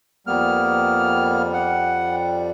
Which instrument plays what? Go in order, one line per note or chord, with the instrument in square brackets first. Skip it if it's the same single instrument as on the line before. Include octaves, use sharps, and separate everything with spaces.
[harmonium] F2 G3 [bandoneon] A#3 B3 F6
[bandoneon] F#5